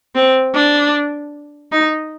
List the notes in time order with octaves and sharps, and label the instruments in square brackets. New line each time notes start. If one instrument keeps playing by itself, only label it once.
[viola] C4
D4
D#4